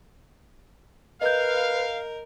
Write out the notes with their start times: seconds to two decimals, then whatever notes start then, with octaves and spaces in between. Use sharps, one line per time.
1.21 A#4 B4 D#5 F5 G6